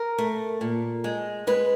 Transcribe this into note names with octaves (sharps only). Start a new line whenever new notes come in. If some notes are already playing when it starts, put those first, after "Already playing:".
Already playing: A#4
A3
A#2
G#3
G#3 B4